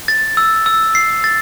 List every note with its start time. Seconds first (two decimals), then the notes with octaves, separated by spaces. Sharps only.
0.08 A6
0.37 E6
0.66 E6
0.95 C7
1.24 A6